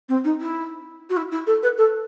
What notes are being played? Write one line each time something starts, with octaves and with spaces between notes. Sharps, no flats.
C4
D#4
E4
F#4
E4
E4
A4
B4
A4